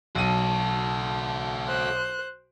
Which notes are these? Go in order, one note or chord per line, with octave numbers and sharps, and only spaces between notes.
B1 F#4 A4 D#7
C5 F#6